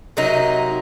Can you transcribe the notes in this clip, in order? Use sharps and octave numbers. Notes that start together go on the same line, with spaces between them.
C3 F#3 A#3 D#4